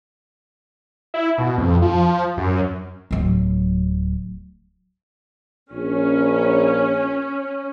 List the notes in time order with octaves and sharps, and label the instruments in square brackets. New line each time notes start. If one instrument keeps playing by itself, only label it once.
[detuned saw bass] E4
B2
F2
F3
F#2
[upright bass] D1 F#3
[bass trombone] A#1 [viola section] C#4